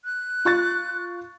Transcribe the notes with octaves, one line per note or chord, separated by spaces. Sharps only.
F#6
F4 C#6 A6